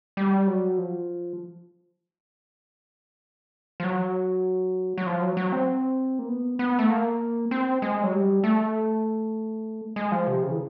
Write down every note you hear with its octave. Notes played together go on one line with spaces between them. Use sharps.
G3
F#3
F3
F3
F#3
F#3
F3
F#3
F#3
C4
A#3
B3
B3
A3
A#3
C4
G#3
F#3
G3
A3
G#3
F3
C3
C#3
E3